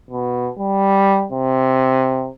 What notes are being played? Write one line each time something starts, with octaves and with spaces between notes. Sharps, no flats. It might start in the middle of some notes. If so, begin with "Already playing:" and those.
B2
G3
C3